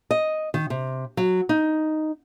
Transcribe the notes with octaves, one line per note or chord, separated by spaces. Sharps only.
D#5
D#3
C3
F#3
D#4